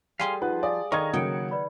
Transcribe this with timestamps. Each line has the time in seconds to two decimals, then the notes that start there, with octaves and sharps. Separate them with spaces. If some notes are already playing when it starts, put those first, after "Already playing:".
0.20 G3 G4 G#4 F5 G#5 C6
0.42 F3 D#4 F4 B4 F#5
0.63 D5 F5 G#5 D#6
0.92 D#3 A#4 D5 D#5 C#6 G#6
1.13 C#3 F#3 A#3 F#5 G5 D#6 C#7 D7
1.51 B4 D5 B5